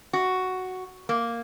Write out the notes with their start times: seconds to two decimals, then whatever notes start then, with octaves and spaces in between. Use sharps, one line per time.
0.13 F#4
1.09 A#3